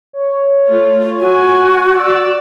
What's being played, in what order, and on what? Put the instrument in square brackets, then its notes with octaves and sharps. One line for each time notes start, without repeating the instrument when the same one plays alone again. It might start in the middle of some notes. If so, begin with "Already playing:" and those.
[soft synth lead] C#5
[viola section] A3 F4
[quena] F#4 [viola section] G#5
[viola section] D5 [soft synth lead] E6